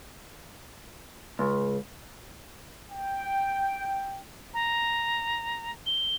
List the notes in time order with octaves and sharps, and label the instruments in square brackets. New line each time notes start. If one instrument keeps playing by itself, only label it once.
[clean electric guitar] C#2
[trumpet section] G5
[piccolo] A#5
G7